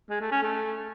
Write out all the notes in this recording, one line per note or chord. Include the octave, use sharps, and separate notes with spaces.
G#3
A3
C#4
A3